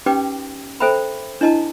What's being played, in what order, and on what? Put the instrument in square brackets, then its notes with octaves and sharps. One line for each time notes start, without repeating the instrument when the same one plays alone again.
[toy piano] C#4 D#4 G4 B4 G5 D6
A4 C5 E5 G5 A#5 B5
D4 E4 D#5 A5 A#5